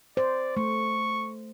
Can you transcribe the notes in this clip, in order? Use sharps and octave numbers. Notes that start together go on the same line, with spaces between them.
C5 D5
A3 C#6